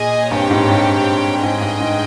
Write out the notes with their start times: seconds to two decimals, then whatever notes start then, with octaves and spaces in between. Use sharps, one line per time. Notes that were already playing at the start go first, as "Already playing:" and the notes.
Already playing: A#2 G#4 D#5 G#5
0.31 G2 C4 G4 C#5 G5
0.51 G#2
0.69 G2
1.42 G#2 G#4 D#5 G5
1.61 G2
1.80 G#2